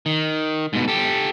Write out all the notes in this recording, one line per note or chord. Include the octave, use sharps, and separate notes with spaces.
D#3
G#2 B2
G4 A4